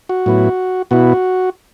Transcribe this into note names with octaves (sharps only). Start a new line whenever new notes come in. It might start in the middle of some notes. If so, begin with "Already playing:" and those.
F#4
A2 F#3 B3 E4
B2 B3 E4 F#4